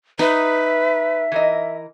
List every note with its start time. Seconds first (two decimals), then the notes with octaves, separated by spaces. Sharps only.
0.19 D#4 B4 E5
1.32 E3 A#4 D#5